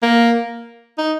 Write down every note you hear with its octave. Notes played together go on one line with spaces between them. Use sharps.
A#3
D#4